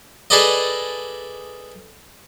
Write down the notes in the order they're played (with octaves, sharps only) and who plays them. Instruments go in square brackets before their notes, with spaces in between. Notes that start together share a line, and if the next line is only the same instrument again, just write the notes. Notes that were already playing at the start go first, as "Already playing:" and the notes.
[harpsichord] G#4 A4 B4 D5 D#5